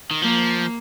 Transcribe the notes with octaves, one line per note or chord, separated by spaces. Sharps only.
D#3
F3 A#3